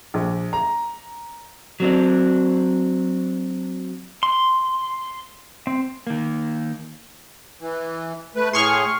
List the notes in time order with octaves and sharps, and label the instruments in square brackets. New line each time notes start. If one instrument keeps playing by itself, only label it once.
[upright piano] A#1
A#5
[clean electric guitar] F#3 C4 D4
[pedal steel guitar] C6
C4
[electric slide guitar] D#3 A#3
[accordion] E3
A3 B4
[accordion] A2 G#4 [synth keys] C6 C#6 F6